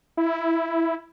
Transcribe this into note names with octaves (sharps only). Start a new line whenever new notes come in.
E4